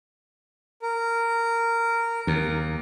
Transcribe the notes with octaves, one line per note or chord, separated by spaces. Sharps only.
A#4
D#2